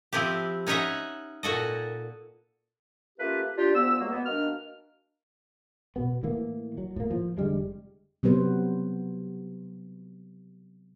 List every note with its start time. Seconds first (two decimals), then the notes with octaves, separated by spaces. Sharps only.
0.13 F3 C4 E4 G4
0.67 C#4 D#4 C#5 D#5 E5 F#5
1.43 A#2 F#4 A4 D#5
3.18 A3 A#3 C#4 F4 G4 B4
3.56 D4 F4 G4
3.75 D2 F3 B3 E6
3.99 C#2 F#3 G#3 A#3
4.11 B3
4.26 D#3 A#3 D4 F#4 F6
5.96 B2 B3
6.23 A2 E3 A#3
6.78 F#3
6.96 A2 A#3
7.10 F3
7.37 F1 D3 G3 G#3
8.23 C3 F#3 B3 B4 C5